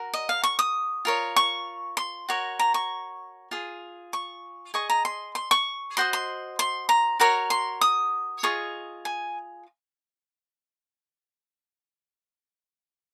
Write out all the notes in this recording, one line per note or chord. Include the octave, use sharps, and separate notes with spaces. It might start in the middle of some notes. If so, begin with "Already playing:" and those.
Already playing: F#4 A#4
D#5
F5
C#6
D#6
F4 A#4 C#5
C#6
C6
F#4 A#4 C#5
A#5
C#6
F4 G#4
C#6
G#4 D#5 C#6
A#5
C6
C6
C#6
F#4 C5 D#5 C6
C6
C6
A#5
F#4 A#4 C#5 A#5
C6
D#6
F4 G#4 D#5 C#6
G#5